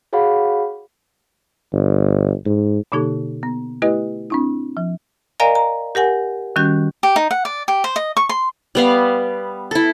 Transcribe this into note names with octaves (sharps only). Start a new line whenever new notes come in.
F#4 G#4 C#5 F5 F#5 B5
G1
G#2
B2 D3 A#3 D#4 G4 A4
B3
A3 E4 G4 B4 D#5
C4 D4 E4
F3
A#4 D5 D#5 F5 G#5 A#5
A#5
G4 A#4 F#5 G#5
D#3 G3 C#4 F#4 G6
G4
D#4
F#5
D5
G4
C5
D#5
C#6
C6
G3 B3 F5
E4 A4